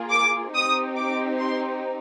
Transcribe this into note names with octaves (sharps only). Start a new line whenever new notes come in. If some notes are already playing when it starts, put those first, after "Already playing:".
Already playing: A#3 F4 G#4
D6
C4 D#4 G4 D#6
D6
C6